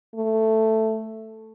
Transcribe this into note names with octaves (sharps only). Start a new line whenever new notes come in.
A3